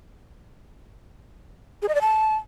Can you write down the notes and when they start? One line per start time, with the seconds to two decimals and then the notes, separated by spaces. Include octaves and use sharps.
1.82 G#4
1.88 D#5
1.95 D5
2.01 A5